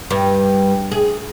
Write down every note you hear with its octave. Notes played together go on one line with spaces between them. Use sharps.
G2
G#4